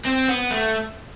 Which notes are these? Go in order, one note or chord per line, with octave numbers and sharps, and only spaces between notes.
C4
B3
A3